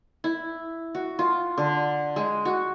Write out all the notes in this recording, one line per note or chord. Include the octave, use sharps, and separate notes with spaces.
E4
F#4
F4
D3
G#3
F#4